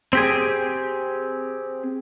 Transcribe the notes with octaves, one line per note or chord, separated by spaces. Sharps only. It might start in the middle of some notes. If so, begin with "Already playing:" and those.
C4 G4 G#4